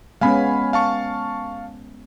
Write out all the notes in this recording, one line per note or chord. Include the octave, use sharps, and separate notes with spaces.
G#3 B3 C#4 F5 G#5 B5
F5 A5 C#6